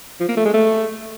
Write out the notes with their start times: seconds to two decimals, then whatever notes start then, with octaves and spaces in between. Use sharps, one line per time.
0.20 F3
0.29 A#3
0.37 A3
0.45 G#3
0.53 A3